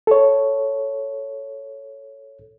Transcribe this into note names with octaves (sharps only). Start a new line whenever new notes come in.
A4 C#5